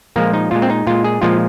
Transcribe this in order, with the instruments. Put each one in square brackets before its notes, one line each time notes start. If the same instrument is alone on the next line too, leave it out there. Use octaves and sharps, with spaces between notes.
[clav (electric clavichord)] A#2 F3 G#3 A#3
D#4
A#2 G#3 F4
C4
D#4
A#2 G#3 F4
G#4
A#2 F3 G#3 F4